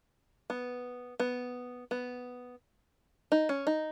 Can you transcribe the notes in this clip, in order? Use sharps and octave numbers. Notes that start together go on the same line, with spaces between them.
B3
B3
B3
D#4
C#4
D#4